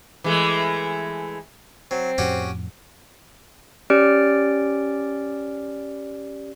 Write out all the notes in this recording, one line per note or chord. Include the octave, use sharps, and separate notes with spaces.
E3 G#3 A3
F#3 C4
F2 A2 F3 C#4 F#4 G4
C#4 G4 D5 F6 D7